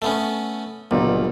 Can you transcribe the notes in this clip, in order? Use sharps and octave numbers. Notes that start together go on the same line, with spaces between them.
A3 B3 C#4
G1 C#2 A#2 F#3 G3